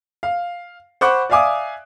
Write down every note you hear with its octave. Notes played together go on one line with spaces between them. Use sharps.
F5
C5 F#5 B5 C#6 D6 F#6
D5 E5 F5 G#5 D6 D#6